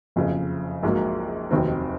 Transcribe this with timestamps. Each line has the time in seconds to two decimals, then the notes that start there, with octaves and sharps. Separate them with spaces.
0.16 F#1 F2 C#3
0.83 A#1 G#2 F#3 A#3
1.51 F1 D#2 D#3 F#3 C4